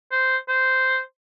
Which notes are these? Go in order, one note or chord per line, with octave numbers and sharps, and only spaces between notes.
C5
C5